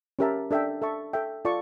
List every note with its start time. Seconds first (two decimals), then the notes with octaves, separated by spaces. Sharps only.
0.19 C#4 G4 A#4 E5 A5
0.51 D4 A4 E5 G5
0.82 A4 E5 A5 C#6
1.13 A4 E5 G5
1.45 F4 A4 D5 A5 C#6